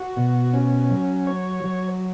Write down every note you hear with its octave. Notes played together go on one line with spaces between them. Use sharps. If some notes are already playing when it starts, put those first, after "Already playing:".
Already playing: F#4
B2
C#4
F#3
C#5
F#3